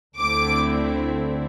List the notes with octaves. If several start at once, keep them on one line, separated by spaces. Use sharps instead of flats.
D2 D3 A3 C4 E4 D6